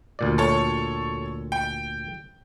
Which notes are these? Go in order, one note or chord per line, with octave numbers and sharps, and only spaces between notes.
D2 A#2 D5
A4 C#5
G5